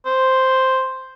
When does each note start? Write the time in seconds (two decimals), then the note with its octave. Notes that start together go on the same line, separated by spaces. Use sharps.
0.06 C5